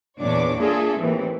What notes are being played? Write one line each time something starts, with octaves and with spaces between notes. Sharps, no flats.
E2 A#2 D4 C#5 D6
A#3 D4 F4 G#4 A4 E5
D#2 A2 E3 C4